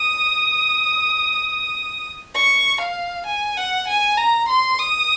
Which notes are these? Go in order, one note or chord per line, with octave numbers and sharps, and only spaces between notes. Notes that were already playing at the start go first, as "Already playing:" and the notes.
Already playing: D#6
C#6
F5
G#5
F#5
G#5
A#5
C6
D#6